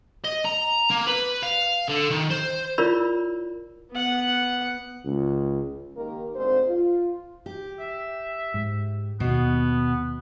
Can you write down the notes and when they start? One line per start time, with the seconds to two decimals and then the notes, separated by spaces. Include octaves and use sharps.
0.24 D#5
0.45 A#5
0.91 A#3
1.07 B4
1.43 F5
1.88 D3
2.10 D#3
2.30 C5
2.78 E4 F4 A#4 C#5 D5 B5
3.91 B3 F#5
5.05 C#2
5.97 D#3 A#3 G4 A#4
6.35 D2 G#2 C4 C5
6.68 F4
7.46 G4
7.80 E5
8.54 G#2
9.20 D#2 B2 B3